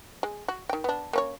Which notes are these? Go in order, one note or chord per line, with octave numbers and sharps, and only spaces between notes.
G#3
F#4
D#3 G5
B3 D4
A#3 C#4 C#5